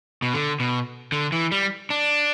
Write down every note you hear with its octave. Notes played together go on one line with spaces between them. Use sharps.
B2
D3
B2
D3
E3
G3
D4